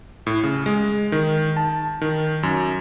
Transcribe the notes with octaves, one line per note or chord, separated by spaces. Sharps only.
A2
C#3
G#3
D#3
A5
D#3
F#2